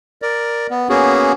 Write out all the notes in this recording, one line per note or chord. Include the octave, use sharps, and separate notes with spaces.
A#4 D5
B3
A#3 B3 C#4 F#4 G#4